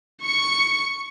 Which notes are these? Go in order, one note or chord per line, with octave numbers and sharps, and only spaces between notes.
C#6 C#7